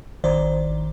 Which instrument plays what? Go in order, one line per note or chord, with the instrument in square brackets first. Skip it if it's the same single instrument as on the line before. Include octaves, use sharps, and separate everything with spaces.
[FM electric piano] A1 D#3 C5 D5